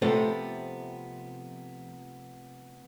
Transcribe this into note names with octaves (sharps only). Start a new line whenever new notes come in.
C3 F3 A3 B3 C4